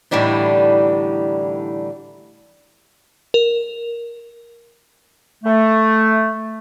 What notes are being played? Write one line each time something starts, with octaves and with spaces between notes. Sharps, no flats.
A2 D3 E3 G3 D4 D#4
A#4
A3